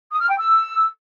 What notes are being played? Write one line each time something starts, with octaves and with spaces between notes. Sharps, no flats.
D#6
F6
G5
E6